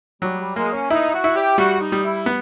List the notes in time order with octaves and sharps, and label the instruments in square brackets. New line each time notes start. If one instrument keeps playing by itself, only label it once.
[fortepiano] F#3 [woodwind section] G3
[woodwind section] G3
[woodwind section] G#3 [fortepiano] A#3
[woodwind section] C#4
[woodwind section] D#4 [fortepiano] E4
[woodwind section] F#4
[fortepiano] E4
[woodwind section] G4
[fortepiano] G3 [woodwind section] F#4
[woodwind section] D#4
[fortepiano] G3
[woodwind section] E4
[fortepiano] B3